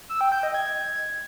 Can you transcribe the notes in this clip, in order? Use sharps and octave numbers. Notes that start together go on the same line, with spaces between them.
E6
G5
G6
D#5
G#6